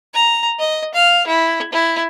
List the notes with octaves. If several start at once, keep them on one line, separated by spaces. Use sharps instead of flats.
A#5
D#5
F5
E4
E4